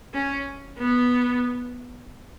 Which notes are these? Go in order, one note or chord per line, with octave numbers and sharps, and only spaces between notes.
C#4
B3